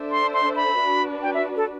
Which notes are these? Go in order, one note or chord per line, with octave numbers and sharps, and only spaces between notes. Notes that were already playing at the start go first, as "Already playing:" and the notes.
Already playing: D4 A4 C5 E5
C6
C6
B5
D4 F#4 B4
G5
E5
A4